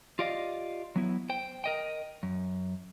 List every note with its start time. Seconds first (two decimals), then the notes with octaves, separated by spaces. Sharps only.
0.19 F4 G4 D5 D#5 F5
0.96 F#3 B3 E4
1.30 C5 G5
1.64 A#4 D#5 G5
2.23 F#2